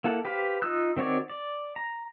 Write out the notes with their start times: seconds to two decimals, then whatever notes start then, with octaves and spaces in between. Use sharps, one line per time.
0.04 A#3 E4 A4 F#5
0.25 G4 B4 C5 F5
0.62 D#4 F4 D#6 E6 F#6
0.97 D#3 C4 F#4 C#5 D5
1.30 D5
1.76 A#5